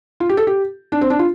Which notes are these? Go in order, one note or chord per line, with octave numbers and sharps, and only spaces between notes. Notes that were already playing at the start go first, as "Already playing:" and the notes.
F4
G4
A4
G4
D4
C4
D4
F4